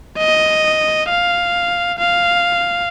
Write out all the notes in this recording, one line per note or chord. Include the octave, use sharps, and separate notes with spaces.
D#5
F5
F5